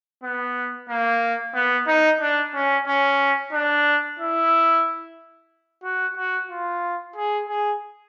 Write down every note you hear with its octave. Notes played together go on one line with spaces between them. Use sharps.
B3
A#3
B3
D#4
D4
C#4
C#4
D4
E4
F#4
F#4
F4
G#4
G#4